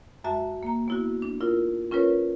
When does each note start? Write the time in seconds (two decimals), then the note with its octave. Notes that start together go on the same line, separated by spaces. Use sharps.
0.24 F#2 G#3 F#4 E5 A5
0.63 A#3 A#5
0.88 B3 E4 F#4
1.22 D4
1.41 E4 F4 A#4
1.91 C#4 F4 A#4 B4 C#5